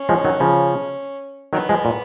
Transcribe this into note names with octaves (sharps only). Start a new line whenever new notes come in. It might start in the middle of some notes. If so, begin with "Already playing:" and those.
Already playing: C#4
F3 G#3
D#3 F#3
C#3 F3
D#3 F#3 B3
F3 G#3
A#2